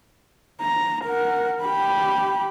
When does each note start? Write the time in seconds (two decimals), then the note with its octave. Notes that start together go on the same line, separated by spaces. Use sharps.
0.61 A#5
1.05 A#4 F#5
1.61 G4 B5